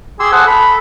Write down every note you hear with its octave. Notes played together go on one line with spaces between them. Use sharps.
G4 G#4 C6 E6
G#4 A4 C5 F#5
A4 B5